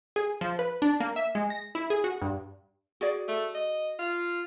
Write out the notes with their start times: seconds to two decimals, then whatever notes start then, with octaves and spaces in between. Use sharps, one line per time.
0.16 G#4
0.41 F3
0.59 B4
0.82 D4
1.00 A#3
1.16 E5
1.35 G#3
1.50 A#6
1.75 E4
1.90 G#4
2.04 F#4
2.22 G2
3.01 F#4 G#4 D5
3.28 A3
3.55 D#5
3.99 F4